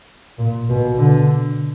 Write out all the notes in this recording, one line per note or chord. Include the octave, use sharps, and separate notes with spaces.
A#2
B2
D3